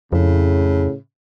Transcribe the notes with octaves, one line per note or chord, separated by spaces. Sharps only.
F2 A2 C#3